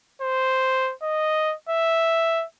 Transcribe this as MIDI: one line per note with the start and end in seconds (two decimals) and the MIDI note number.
0.22 0.93 72
1.03 1.55 75
1.69 2.45 76